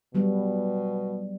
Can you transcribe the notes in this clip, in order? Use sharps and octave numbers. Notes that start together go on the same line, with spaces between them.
B2 F#3 G3 B3